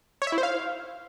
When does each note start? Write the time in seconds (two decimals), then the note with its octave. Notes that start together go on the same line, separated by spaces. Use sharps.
0.22 C#5
0.27 E5
0.32 E4
0.38 C5
0.43 F5